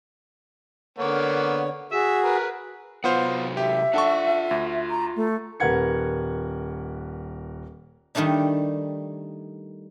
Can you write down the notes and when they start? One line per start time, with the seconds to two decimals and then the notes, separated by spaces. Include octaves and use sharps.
0.99 D3 A#3 B3 C#5
1.92 F#4 G#4 E5
2.24 A#4 B4
3.04 C3 F#3 B3 F4 C5 F#5
3.57 G4 E5
3.94 D4 F4 A4 F#5 C#6
4.51 D2
4.90 A#5
5.16 A3
5.60 D#1 A#4 B4 F#5 G#6 C#7
8.15 D#3 G3 A3 D4 D#4